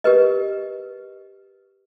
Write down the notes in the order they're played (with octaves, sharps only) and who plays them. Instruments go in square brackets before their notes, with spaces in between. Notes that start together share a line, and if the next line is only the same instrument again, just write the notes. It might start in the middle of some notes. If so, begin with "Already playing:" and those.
[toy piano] G4 A#4 B4 D#5